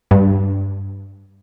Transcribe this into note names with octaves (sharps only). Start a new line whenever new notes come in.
G2